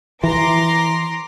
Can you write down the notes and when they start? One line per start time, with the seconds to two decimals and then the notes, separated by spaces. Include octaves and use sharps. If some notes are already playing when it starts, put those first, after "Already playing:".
0.24 E3 A#5 C6 D6